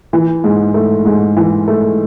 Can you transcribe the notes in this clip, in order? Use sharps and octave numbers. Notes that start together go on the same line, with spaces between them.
E3
G#2
A3
G#2
E3
A3